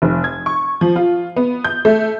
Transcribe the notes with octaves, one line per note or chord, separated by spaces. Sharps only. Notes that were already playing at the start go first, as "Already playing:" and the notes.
F1
G#6
C#6
F3
F4
B3
G6
A3